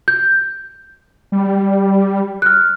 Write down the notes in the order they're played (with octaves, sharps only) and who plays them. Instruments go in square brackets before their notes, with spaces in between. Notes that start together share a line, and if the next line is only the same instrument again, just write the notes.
[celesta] G6
[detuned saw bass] G3
[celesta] F6 F#6